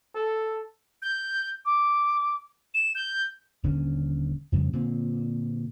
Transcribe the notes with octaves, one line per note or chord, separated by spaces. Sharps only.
A4
G6
D6
E7
G6
D#1 D3 C#4
F2 C#3 G3
A#2 D3 C4